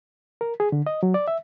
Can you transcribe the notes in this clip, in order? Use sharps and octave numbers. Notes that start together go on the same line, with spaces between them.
A#4
G#4
D3
D#5
F#3
D5
E5